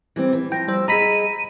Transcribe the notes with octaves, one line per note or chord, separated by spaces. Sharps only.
E3 G3 C4
E3
F3 G5 A#6
G3 C5 E6
G#4 D#5 A#5 B5 B6 D#7